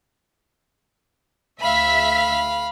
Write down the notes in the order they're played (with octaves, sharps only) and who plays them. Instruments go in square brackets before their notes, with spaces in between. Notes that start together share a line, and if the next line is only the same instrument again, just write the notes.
[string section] D2 E5 B6 [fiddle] F5 B5